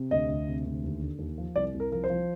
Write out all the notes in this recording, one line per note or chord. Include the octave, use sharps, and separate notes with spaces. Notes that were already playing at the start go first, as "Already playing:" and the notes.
Already playing: C3
D2 D#5
D2
C3
D2
D#2
D3
D#2
F3
C2 D5
C2
A#4
F3 A#4
C5
F3